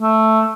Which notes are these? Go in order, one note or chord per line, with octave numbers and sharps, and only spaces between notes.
A3